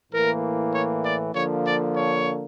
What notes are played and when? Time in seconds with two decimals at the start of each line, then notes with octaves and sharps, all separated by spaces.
0.11 A2 E3 A#3 A#4
0.73 C#5
1.04 D5
1.34 D3 F3 A#3 C#5
1.65 D5
1.95 C#5